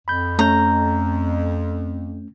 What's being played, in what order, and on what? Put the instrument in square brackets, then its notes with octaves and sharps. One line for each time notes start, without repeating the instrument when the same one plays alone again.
[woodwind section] F2 [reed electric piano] B5 G6
[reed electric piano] A3 C#4 G6 [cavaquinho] A#5